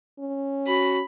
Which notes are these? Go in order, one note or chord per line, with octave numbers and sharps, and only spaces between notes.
C#4
F#4 B5